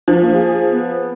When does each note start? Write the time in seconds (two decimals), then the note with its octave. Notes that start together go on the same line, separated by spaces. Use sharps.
0.08 F3
0.22 A#3
0.34 G#4
0.72 B3